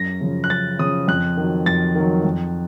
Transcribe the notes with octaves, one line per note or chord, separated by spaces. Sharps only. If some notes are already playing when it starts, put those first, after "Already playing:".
Already playing: F#2 A#6
C#3 F3
F#6
F#2 A6
C#3 F3 D#6
F2 F#6
D#3 F#3
F2 A6
D#3 F#3
F2